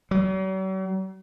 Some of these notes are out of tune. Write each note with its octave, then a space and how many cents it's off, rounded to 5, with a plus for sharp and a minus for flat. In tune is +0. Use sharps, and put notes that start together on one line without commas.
F#3 +45